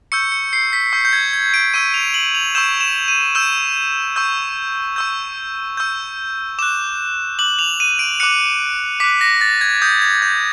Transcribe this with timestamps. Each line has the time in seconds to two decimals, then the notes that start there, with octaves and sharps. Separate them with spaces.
0.12 C#6 E6 G6 C#7
0.32 C#7
0.53 C7
0.73 B6
0.93 C#6 E6 G6
1.05 G6
1.13 G#6
1.33 G#6
1.54 D7
1.74 C#6 E6 G6 D#7
1.94 F7
2.14 F#7
2.35 F7
2.55 C#6 E6 G6 E7
2.81 E7
3.08 D#7
3.35 C#6 E6 G6 E7
4.16 C#6 E6 G6
4.96 C#6 E6 G6
5.77 C#6 E6 G6
6.59 D6 F#6 E7
7.39 D6 F#6 F#7
7.59 F7
7.80 D#7
7.99 D7
8.20 D6 F#6 C#7
9.00 D6 F#6 B6
9.21 A#6
9.41 A6
9.61 G#6
9.82 D#6 G6
10.01 G#6
10.22 G6